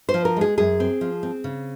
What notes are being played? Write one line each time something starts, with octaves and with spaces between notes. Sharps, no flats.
C5
F3
A#4
G#3 G#4
F#2 G#4
C4
F3
C4
C#3